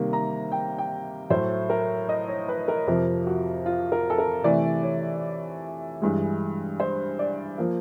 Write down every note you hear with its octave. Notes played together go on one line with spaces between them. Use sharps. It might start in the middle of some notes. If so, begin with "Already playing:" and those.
Already playing: C3 D#3 G3 A#3
A#5
G5
G5
A2 F#3 A3 C5
A#4
D#5
C#5
B4
A#4
F2 C3 F3 A#4
F#4
F4
A#4
A4
A#4
C3 E3 A3 D5
C#5
G2 E3 G#3
C5
D5
F3 A#3